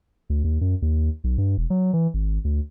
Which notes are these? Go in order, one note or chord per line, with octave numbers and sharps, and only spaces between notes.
D2
D#2
F#2
D#2
B1
G2
E1
F#3
E3
G#1
D2